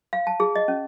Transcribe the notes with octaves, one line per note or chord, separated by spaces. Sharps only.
F5
A5
G#4
D#5
C#4